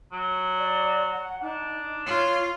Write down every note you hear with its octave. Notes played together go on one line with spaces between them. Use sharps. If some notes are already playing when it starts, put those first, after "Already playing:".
F#3
D5
F#5
D4 D#4
F4 C#5